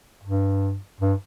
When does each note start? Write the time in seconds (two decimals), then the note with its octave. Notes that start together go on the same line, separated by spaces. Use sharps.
0.23 G2
1.00 G2